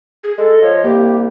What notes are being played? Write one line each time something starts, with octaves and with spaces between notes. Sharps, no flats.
G#4
G#3 A4
D#5
F3 C#5
C2 A#3 G4